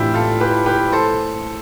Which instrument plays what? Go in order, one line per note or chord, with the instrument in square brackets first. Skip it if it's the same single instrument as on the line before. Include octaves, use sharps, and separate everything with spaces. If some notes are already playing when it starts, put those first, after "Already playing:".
Already playing: [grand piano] A2 E3 [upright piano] C4 D4 E4 F4 G4
[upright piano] F4 A4
G4 B4
G4 B4
A4 C5